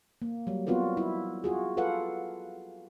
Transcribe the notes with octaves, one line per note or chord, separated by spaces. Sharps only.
A#3
F#3 G3
B3 C4 F4 F#4 A#4 B4
E4
F4 F#4 G#4
F4 A4 B4 F5 F#5